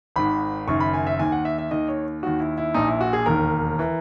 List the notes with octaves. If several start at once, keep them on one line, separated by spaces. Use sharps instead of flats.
G#1 G#2 D#3 B5
F#1 F#2 D#3 C#6
B5
G#5
E5
D#2 D#3 G#5
F#5
E5
E5
D#2 D#3 D#5
C#5
D#2 D#3 F#4
E4
E4
A#1 A#2 D#4
E4
F#4
G#4
E1 D#2 D#3 A#4
E3